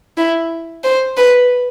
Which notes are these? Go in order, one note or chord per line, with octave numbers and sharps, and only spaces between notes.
E4
C5
B4